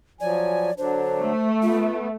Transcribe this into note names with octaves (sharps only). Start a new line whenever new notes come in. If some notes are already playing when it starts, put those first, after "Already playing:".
F3 F#3 D5 G#5
D3 F#3 D4 C5
A3
B3 F4